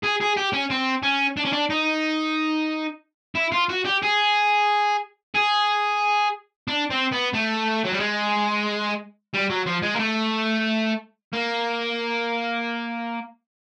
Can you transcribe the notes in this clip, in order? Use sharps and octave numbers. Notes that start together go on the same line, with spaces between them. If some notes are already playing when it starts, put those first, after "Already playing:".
G#4
G#4
G4
C#4
C4
C#4
D4
C#4
D4
D#4
E4
F4
F#4
G4
G#4
G#4
D4
C4
B3
A3
F#3
G3
G#3
G3
F#3
F3
G#3
A#3
A3
A#3